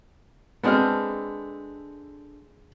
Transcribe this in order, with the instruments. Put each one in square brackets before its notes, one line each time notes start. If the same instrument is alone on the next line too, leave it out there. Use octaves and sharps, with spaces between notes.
[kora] G#3 D4 A4 [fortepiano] B3 C4 F6